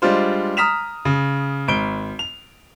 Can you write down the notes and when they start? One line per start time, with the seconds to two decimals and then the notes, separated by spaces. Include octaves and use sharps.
0.02 G3 G#3 D4 F4 C5
0.57 A#5 D#6 F6 B6 E7 F7
1.05 C#3
1.68 G#1 D7 G7
2.19 F7